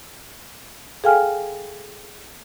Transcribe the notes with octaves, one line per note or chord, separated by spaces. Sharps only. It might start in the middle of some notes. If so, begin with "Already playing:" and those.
G#4 A4 F5 G5 G#5 F6